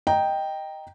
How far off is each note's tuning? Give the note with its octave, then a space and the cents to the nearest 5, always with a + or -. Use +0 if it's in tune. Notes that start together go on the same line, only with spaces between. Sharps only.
D#5 +0 G5 +0 A#5 +0